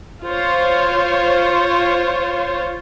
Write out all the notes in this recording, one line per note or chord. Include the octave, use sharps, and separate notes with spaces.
F4 C5 C#5